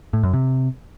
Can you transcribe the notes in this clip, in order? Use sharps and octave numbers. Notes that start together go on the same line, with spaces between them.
A2
F#2
C3